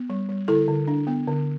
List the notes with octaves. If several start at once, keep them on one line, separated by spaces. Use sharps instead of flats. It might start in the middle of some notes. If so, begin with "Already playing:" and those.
Already playing: B3
G3
G3
D3 E4 A4
D3
D4
B3
D3